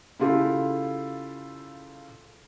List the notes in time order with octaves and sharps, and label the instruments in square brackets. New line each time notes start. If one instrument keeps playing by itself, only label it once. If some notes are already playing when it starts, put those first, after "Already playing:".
[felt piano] C#3 E4 F4 G4 A4